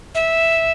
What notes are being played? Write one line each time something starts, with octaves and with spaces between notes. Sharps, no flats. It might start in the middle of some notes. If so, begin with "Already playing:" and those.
E5